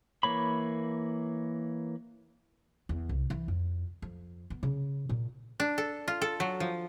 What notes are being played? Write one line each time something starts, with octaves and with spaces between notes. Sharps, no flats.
E3 A#3 C#5 B5
E2
C2
E3
F2
F2
B3
C#3
A#2
D4
A4
F4
A4
F#3
F3